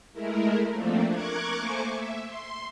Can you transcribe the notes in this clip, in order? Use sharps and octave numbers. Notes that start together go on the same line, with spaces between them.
G#3 A3 E4 A#4
F3 A3 A#3 C4 D4
A#4 C#6 D6 F#6 G#6
A3 A#3 C5 G#5 C#6 D6
E5
C6